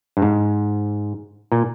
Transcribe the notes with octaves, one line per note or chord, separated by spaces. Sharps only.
G2
G#2
A#2